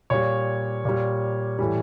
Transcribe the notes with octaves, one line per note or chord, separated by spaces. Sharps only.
A#2 G3 C#5
A#2 G3
A2 E3 G3